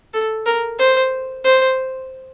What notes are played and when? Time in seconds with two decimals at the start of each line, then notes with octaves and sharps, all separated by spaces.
0.13 A4
0.46 A#4
0.79 C5
1.44 C5